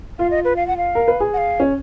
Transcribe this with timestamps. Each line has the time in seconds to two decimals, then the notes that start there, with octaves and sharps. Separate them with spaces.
0.19 F4 F5
0.31 D#5
0.44 B4
0.56 F5
0.67 F#5
0.77 F5
0.95 A#4
1.08 B4
1.20 G#4
1.33 F#5
1.37 F5
1.60 C#4